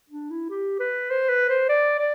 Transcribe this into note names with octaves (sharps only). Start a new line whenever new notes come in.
D4
E4
G4
B4
C5
B4
C5
D5
D5